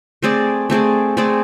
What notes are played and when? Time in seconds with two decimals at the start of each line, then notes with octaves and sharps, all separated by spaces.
0.22 A3 C4 G#4 D5
0.70 A3 C4 G#4 D5
1.17 A3 C4 G#4 D5